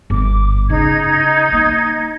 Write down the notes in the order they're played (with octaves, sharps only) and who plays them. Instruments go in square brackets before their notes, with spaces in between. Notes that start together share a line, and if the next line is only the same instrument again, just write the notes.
[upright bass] G1 [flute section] D6
[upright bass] C#3 [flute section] D#4 G#6
[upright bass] A#3